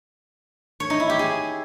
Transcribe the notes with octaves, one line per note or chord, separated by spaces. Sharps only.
C#5
D#4
E4
G4
G#4